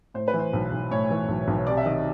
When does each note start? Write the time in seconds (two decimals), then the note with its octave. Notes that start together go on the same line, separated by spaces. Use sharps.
0.14 A2 C5
0.28 B4
0.33 E3
0.39 C5
0.53 B1
0.72 B1
0.91 A2 C#5
1.10 E3
1.28 B1
1.48 B1
1.67 C3 D5
1.77 E5
1.86 D#3 D#5